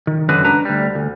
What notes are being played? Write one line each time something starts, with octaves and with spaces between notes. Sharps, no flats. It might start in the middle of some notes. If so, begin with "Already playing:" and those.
D#3
C#2 F#2 D3 F#4 G#4 B4
D4 B4 A#5
D2 G3
D2